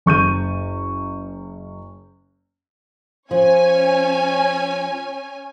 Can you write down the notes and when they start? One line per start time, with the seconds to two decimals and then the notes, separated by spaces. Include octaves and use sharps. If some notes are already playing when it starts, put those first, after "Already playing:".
0.06 F#1 C#6 G6 D#7
3.31 F3 C#4 C#5 G#5